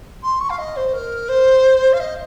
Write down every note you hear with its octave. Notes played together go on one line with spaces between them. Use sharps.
C6
C#6
F5
D#5
C5
A#4
C5
F5
D#5